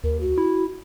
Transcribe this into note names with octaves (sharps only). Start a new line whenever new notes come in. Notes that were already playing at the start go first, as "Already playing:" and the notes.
D#2 A#4
F#4
E4